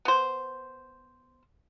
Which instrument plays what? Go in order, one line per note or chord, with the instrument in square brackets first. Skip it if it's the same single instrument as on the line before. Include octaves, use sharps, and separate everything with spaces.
[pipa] B3 C5